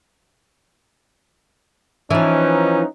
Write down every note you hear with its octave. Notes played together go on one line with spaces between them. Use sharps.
E3 F3 C#4 D#4